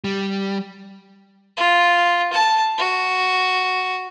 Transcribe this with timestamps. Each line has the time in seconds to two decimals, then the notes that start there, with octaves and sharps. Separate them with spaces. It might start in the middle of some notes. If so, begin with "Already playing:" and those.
0.04 G3
1.57 F4
2.33 A5
2.78 F#4